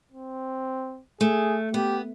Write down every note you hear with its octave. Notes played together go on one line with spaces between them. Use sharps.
C4
A3 G#4
B3 G4